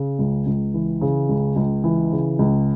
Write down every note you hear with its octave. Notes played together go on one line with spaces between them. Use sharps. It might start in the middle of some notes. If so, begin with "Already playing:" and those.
Already playing: C#3
C#2
C#2
E3
C#3
C#2
C#2
E3
C#3
C#2